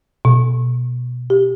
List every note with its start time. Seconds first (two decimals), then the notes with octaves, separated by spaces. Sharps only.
0.25 B2
1.30 G4